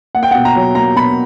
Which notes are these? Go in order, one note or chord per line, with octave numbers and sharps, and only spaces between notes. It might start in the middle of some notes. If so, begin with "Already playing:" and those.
A#3 F#5
G5
B2 F#5
A#5
F#3
A#3 A#5
B2 B5